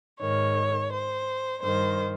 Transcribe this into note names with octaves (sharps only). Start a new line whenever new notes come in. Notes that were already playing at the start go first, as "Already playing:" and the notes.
G#2 D#3 C#5
C5
G2 D#3 C5